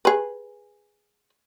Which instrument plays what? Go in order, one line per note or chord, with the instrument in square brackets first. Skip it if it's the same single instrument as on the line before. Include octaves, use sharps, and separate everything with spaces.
[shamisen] G#4 B4